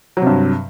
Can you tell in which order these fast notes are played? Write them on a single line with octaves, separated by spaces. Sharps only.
F#3 C3 G2